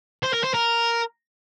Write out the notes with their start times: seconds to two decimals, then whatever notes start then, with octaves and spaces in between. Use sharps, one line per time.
0.23 C5
0.33 A#4
0.43 C5
0.54 A#4